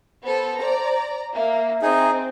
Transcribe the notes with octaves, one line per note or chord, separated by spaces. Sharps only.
B3 A4 C5
D5 A#5
A#3 E5
C4 D#4 G#4